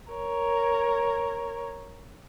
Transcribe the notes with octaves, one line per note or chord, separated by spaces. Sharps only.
A#4 C#5